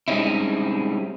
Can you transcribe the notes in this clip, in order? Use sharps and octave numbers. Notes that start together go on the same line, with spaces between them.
G3 G#3 C4 C#4 D#4 E4